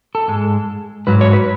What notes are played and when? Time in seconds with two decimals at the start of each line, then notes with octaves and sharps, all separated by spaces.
0.15 A4
0.28 G#2 G#3
1.07 G#2 F#3 B4
1.21 C#5
1.33 B4